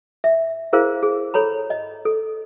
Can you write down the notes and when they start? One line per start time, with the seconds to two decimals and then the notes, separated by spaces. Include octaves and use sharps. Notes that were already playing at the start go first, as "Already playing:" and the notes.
0.24 E5
0.73 E4 G#4 A#4 C5 F5
1.03 G#4
1.34 A4 C#5 A#5 B5
1.70 D#5
2.05 A4